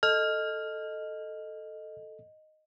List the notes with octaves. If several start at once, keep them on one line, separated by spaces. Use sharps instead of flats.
A4 D#5 F6